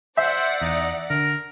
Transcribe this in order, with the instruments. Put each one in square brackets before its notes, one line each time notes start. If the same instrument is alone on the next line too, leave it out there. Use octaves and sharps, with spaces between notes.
[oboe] C5 [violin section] D5 F#5 [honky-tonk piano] E5
[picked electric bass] E2 [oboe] D#4
[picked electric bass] D3 [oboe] A#4